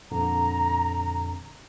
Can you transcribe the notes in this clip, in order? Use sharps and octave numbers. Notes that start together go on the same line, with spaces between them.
F2 A#2 D3 A#5